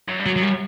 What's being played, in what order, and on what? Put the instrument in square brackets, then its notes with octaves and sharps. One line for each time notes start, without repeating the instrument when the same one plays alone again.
[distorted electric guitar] F#2
G2
[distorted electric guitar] F#2 [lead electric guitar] F#3
[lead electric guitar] F#3
G3